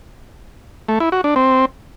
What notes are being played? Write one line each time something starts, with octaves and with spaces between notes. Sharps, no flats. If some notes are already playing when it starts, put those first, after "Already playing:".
A3
E4
F#4
D4
C4